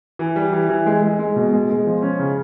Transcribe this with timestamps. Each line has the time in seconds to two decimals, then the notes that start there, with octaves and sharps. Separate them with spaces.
0.19 E3
0.36 G3
0.53 E3
0.69 E3
0.86 G#3
1.02 G#3
1.19 G#3
1.36 B2
1.53 G#3
1.70 G#3
1.86 F3
2.02 C#4
2.19 C#3